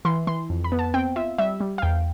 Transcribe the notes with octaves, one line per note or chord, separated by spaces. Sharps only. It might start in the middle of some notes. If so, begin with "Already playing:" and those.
E3 C6
E3 C6
F2
B5
B3
A5
C4 G5
F4 E5
G3 E5
G3
F5
E2 G5